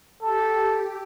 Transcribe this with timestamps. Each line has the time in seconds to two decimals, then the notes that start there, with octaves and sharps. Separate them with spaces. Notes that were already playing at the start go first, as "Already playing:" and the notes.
0.22 G4 A4